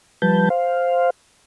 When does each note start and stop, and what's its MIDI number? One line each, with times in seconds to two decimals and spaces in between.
0.22 0.49 53
0.22 0.49 55
0.22 0.49 71
0.22 0.49 81
0.22 0.49 91
0.50 1.10 72
0.50 1.10 77